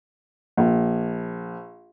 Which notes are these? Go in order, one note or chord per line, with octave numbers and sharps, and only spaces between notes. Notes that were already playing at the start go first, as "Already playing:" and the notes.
A#1